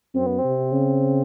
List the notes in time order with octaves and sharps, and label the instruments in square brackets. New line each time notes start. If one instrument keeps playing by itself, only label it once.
[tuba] F#2 [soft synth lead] C4
[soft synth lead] B3
C4
[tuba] C3
C#3